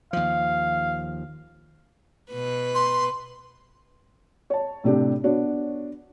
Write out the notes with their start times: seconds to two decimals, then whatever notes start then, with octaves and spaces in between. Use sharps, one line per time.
0.13 D#2 F3 F5
2.32 B2 B4
2.75 C6
4.50 C#5 A5
4.84 A2 C3 D4 G4
5.24 B3 D4 F#4 C#5